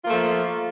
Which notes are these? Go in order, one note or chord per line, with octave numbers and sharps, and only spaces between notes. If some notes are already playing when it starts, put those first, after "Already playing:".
F3 A3 A#3 F4